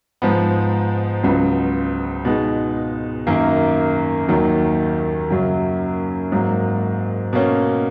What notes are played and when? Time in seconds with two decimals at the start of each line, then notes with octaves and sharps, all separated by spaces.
0.22 G#2 F3 B3
1.23 C#2 C#3 F#3 B3
2.25 B2 G#3 B3 D#4
3.27 F#2 D#3 A#3
4.28 D#2 D#3 F#3
5.30 F#2 C#3 F#3 C#4
6.32 G#2 F#3 A#3
7.33 B2 A#3 C#4